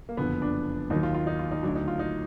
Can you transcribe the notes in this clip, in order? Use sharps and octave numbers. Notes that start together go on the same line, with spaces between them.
A#3
F#1 F2 D3 B3
D4
D#2 D#3 F#3 D#4
F4
F4
D#4
F4
D#4
D2 D3 F#3 D4
D#4
F4
D#4